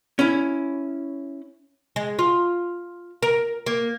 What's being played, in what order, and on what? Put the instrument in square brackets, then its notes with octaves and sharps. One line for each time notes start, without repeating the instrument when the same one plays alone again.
[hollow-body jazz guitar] C#4 E4
[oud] G#3
F4
A#4
A#3